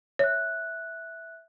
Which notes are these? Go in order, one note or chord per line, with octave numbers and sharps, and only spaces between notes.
C#5 E5 F#6